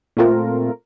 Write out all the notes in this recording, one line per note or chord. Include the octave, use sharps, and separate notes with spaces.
A#2 A3 C4 F4 A#4